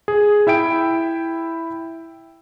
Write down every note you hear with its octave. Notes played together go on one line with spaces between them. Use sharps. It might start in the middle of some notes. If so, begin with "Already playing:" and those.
G#4
E4 E5 G5 D7